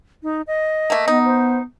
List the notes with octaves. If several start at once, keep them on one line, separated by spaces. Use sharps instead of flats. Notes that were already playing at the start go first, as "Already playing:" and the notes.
D#4
D#5
A3 A#3
B3 D#4
C5